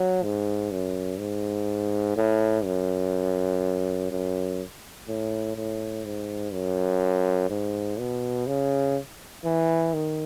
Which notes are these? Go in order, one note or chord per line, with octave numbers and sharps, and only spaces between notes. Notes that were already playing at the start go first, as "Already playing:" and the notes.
Already playing: F#3
G#2
F#2
G#2
A2
F#2
F#2
A2
A2
G#2
F#2
G#2
B2
C#3
E3
D#3